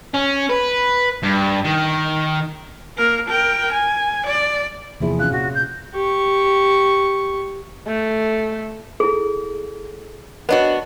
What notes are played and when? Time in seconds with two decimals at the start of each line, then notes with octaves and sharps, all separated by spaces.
0.14 C#4
0.49 B4
1.23 G2
1.65 D#3
2.97 A#3 A#4
3.29 A#4 G5
3.73 G#5
4.27 D5
5.00 E2 C3 F3 A#3 E4 G#4
5.19 C#4 F4 F5 F#6
5.32 A#2 F#4
5.54 G6
5.94 G4 C#6
7.87 A3
9.00 E4 G#4 A4
10.49 B3 D4 F#4 A#4 C#5 D#5